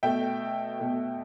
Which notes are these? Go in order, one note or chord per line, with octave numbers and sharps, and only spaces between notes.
B2 A3 E5 G5
B2 A3